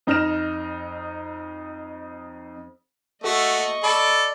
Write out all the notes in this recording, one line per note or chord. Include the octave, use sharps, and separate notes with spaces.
F2 D#4 F6 A#6 E7
A3 F#4 A4 D#5 C#6
A4 D5 B5 D7